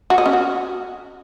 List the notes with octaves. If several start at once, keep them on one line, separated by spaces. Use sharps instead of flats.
F#4
D#5
C#4
F#4